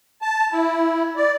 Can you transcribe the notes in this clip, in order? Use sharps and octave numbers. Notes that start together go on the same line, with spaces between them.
A5
E4
D5